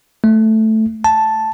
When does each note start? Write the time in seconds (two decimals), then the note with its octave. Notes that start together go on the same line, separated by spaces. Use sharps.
0.24 A3
1.04 A5